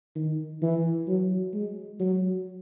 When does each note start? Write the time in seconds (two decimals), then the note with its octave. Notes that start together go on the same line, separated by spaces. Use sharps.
0.16 D#3
0.62 E3
1.08 F#3
1.54 G#3
2.00 F#3